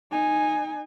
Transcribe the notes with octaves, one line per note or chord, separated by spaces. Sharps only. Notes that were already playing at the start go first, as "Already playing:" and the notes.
D#4 G#5